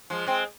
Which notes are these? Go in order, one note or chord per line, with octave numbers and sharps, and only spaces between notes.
F3 G#3
G#3 C4